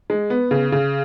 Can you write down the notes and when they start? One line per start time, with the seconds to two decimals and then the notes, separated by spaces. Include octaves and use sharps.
0.10 G#3
0.30 B3
0.51 C#3
0.72 C#3